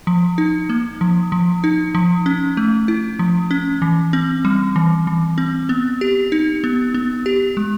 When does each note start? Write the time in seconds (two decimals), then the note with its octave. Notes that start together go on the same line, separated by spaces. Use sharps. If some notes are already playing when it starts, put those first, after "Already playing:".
0.07 F3
0.38 D#4
0.70 A#3
1.01 F3
1.32 F3
1.64 D#4
1.95 F3
2.26 C#4
2.57 A3
2.88 E4
3.19 F3
3.51 C#4
3.82 E3
4.13 C4
4.45 G3
4.76 E3
5.07 E3
5.38 C4
5.69 B3
6.01 G4
6.32 D#4
6.64 B3
6.94 B3
7.26 G4
7.57 G#3